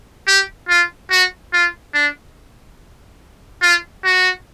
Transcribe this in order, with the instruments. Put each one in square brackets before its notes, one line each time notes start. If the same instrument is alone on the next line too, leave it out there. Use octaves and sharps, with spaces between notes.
[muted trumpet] G4
F4
F#4
F4
D4
F4
F#4